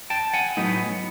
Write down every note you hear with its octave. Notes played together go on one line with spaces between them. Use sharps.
G5 A5
F#5 G#5
A2 F#3 B3 D#4